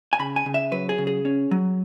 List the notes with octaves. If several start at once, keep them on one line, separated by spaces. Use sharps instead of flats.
G#5
C#3 B5
G#5
C#3
E5
F#3 B4
G#4
C#3
G#4
C#4
F#3